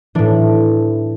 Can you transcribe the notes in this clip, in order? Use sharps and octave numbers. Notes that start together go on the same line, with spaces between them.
A2 E3 D4